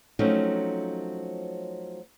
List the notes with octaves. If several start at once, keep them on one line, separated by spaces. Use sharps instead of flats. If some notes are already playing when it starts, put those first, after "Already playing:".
F3 F#3 A3 C4 C#4 D#4